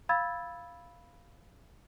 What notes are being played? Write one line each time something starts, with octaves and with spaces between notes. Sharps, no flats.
F5 B5 E6 G#6 A6